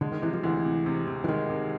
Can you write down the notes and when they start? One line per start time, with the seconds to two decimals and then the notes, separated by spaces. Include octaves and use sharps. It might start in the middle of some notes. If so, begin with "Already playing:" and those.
0.01 D3 G#3
0.12 D#3
0.22 C3 E3
0.33 F3
0.44 D2 E3
0.65 C3
0.86 C3
1.07 C3
1.24 E3
1.28 D#3 G#3
1.50 C3